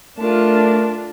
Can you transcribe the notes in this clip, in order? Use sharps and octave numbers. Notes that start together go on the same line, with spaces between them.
A3 D4 F4 A#4 A5